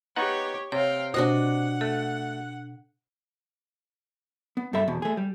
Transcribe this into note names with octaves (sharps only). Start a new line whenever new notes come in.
B3 D#4 G4 C#5 F#5
C3 C#5 F5 G5
B2 D4 F#4 C5 D#5 F#5
A3 A4
B3
G2 A4 E5 B5
E2 B2
A3 G#4
G3